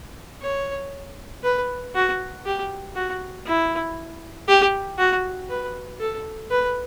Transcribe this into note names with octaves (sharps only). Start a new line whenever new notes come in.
C#5
B4
F#4
G4
F#4
E4
G4
F#4
B4
A4
B4